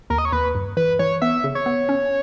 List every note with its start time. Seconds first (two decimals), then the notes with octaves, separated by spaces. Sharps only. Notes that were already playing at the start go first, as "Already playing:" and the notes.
0.10 D#2 A#4
0.18 D#5
0.25 C#5
0.32 D#2 B4
0.55 G2
0.77 E3 B4
0.99 E3 C#5
1.22 B3 E5
1.44 C#3
1.55 C#5
1.66 B3
1.89 C#4